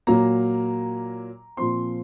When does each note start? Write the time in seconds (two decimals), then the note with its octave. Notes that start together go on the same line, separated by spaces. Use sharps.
0.07 A#2 F#3 A#3 A#5
1.57 A#2 F3 C4 C6